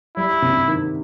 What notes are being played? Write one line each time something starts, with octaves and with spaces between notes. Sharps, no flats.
G3 E4
C3
D#3